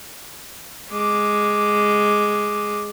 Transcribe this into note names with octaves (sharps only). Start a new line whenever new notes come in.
G#3 D6